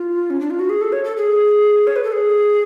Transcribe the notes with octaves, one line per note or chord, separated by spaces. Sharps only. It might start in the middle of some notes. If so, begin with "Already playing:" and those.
Already playing: F4
C#4
D4
F4
F#4
G#4
A4
C#5
A4
G#4
C#5
B4
A4
G#4